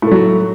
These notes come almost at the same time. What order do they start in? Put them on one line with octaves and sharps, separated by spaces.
A2 A3 F#3